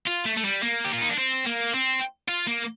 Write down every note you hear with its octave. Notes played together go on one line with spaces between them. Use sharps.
F4
A3
A3
G3
A#3
G4
F4
D#4
D4
C4
A#3
C4
F4
A#3